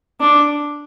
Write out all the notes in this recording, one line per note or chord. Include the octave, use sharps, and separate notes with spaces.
D4